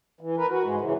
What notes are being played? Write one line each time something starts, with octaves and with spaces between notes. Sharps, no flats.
E3
A#4 B4
F#4
G#2 G#3
C#3 E3